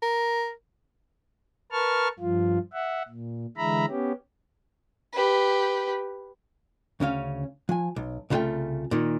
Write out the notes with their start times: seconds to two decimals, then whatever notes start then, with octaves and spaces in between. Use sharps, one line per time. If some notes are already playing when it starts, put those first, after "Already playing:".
0.02 A#4
1.72 A#4 B4 A5 C#6 F6
2.19 G2 F3 F4
2.73 E5 F#5
3.09 A#2
3.57 D3 E3 G#3 E5 A#5 B5
3.88 B3 C#4 G4
5.12 G4 B4
7.00 D2 C#3 C#4 F5
7.69 F3 G#5
7.96 B1
8.30 C2 C#3 F#3 A3 F4 G5
8.91 A#2 D#3